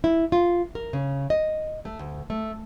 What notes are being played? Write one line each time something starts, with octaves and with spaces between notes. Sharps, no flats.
E4
F4
A#4
C#3
D#5
A3
D2
A3